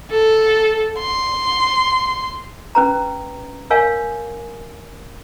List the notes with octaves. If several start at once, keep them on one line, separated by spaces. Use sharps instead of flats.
A4
C6
C#4 B4 A#5
A#4 C#5 F5 G#5